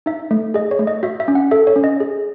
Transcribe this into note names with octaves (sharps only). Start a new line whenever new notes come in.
D#4 E5
A3
G#4 D#5
C#5
A3
D#5
F#4 E5
E5
C#4
F#5
A4 E5
C#5
C#4
D#5
G#4